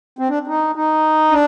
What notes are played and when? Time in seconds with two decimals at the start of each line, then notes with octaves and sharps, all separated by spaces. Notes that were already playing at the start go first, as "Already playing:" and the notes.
0.19 C4
0.29 D4
0.47 D#4
0.75 D#4
1.31 D4